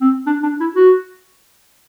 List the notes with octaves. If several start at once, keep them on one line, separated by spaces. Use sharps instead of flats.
C4
D4
D4
E4
F#4